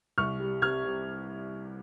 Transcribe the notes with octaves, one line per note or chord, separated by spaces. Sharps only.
C2 C#6 F6
G3
C3 F6 G#6
C3